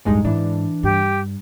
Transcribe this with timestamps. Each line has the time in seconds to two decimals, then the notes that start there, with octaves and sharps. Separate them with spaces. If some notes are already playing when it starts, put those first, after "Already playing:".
0.05 A1 D2 G2 G#3 D#4
0.25 G#2 E3 D4
0.83 G2 G4